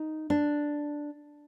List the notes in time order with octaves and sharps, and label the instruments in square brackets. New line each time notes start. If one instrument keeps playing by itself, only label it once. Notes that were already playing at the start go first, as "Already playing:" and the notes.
Already playing: [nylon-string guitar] D#4
D4